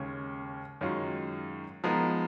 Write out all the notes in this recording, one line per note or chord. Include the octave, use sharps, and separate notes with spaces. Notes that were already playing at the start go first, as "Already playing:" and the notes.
Already playing: D#2 C#3 G#3 C#4
F#2 D#3 G#3 C#4 F4
F3 G#3 B3 D#4 A#4